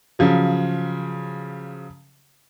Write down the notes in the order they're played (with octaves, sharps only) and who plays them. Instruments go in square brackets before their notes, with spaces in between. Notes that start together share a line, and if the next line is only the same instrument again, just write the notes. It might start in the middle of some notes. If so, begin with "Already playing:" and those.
[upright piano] C#3 F3 F#3